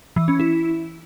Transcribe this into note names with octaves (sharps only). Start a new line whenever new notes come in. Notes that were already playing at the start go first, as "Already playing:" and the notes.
E3
C#4
E4